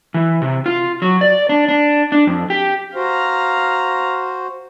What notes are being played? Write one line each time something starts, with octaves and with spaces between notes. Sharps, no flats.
E3
C3
F4
F#3
D5
D4
D4
D4
F2
G4
F#4 C5 F5 A#5